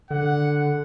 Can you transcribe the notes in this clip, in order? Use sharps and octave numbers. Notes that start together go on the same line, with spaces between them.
D3 F#5